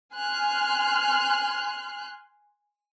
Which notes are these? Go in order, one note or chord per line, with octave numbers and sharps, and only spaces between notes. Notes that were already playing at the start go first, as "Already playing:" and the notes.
G#5 C6 F6 F#6